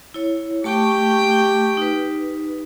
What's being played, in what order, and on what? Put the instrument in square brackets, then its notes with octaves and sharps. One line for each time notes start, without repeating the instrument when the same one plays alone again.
[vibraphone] E4 C#5
[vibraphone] A3 A5 C#6 [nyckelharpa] G4 G5
[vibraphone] D#4 B4